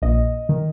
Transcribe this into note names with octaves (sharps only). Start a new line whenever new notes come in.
A#1 D#5
D#3